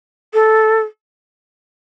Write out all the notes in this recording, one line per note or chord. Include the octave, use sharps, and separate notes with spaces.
A4